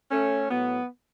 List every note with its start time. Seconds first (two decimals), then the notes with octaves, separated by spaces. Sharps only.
0.11 A3 C#4
0.50 A2 F#3 B3